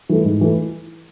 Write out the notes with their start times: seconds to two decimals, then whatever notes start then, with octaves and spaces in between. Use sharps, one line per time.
0.09 E3 A3
0.25 G#2
0.41 E3 A3